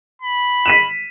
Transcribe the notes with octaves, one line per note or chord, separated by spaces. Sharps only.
B5
B6 D#7 E7